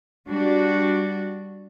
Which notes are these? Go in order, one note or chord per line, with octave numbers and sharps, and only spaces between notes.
G3 D4 F#4